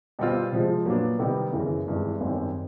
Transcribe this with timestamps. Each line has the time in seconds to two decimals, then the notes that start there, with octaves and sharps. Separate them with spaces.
0.19 B2 G3 C4 F4
0.52 C3 F3 G#3
0.85 A#2 F#3 B3 D4
1.19 C3 D#3 G3 B3 D#4
1.53 F#2 C#3 E3
1.86 G#1 G2 E3 G#3
2.20 G#1 F#2 D#3 G3 C4